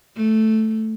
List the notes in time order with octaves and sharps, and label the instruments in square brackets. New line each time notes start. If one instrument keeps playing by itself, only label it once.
[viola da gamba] A3